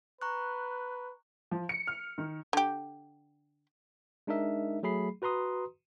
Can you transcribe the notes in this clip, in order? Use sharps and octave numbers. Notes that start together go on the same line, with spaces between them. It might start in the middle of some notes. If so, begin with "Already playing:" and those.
B4 A#5 C#6 F#6
F3
C#7
F6
D#3
D3 G4
G#3 D4 D#4 A#4 E5
F#3 A3 G#4 B5 C7
F#4 B4 A#5 C6 D#6